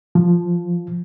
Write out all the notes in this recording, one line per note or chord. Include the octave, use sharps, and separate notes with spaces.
F3